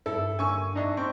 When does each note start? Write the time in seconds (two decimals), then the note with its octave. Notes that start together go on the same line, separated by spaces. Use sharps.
0.06 G2 E4 A4
0.39 D3 A#3 G#5 C#6 E6
0.76 D4 D#4 D#5 E5
0.97 C4 C#6